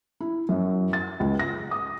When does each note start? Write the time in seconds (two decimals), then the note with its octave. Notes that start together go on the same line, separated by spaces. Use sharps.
0.20 E4
0.49 F#2
0.93 A6
1.20 C#2
1.39 A#6
1.71 D#6